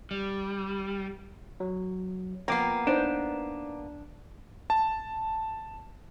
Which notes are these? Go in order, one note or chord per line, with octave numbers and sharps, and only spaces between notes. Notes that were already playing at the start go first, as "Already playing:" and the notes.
G3
F#3
F3 A#3 B3 G5 A#5 D6 C7
D4 D#4 B4 C5
A5